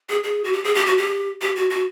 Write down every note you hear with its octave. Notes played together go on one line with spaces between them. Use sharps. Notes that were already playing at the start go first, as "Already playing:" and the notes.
G#4
G#4
F#4
G4
G#4
G4
F#4
G4
G4
F#4
F#4